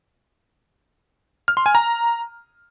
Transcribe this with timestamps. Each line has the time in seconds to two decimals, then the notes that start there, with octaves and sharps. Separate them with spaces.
1.48 F6
1.57 C6
1.66 G#5
1.75 A#5